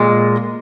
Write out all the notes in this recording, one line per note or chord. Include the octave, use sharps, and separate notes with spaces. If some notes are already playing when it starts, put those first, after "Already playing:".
Already playing: A#2 G#3